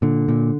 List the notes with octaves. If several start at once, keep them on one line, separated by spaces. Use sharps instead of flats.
A#2 D3
A#2